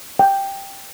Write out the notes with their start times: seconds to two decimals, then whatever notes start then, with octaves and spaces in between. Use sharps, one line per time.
0.19 G5